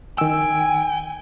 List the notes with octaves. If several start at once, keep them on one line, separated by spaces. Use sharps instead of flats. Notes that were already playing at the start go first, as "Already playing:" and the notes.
D#3 G5 G#5 E6